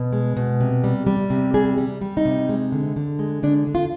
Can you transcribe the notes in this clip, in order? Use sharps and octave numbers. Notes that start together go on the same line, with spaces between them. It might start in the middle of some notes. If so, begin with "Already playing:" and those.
Already playing: B2
G#3
B2
C3
G3
G3
C3
G3 G#4
G3
G3
D#4
C3
G#3
D3
D3
G#3
D3 D4
D3
F4